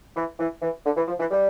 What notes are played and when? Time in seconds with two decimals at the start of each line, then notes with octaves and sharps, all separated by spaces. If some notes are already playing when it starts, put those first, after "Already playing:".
0.16 E3
0.39 E3
0.62 E3
0.85 D3
0.96 E3
1.08 F3
1.20 E3
1.31 G3